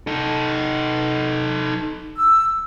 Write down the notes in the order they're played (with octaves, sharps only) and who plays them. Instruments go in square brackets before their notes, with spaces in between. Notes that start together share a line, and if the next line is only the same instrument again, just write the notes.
[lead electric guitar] D#4 A4
[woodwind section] E6